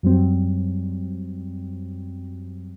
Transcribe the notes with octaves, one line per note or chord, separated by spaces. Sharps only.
F#2 F#3 G3 C4